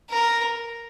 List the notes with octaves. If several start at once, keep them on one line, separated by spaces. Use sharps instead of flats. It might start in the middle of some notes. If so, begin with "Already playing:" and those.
A#4